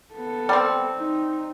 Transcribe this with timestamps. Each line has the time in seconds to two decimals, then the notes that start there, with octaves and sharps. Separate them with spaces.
0.14 B3 A4
0.49 G3 C4
0.97 D#4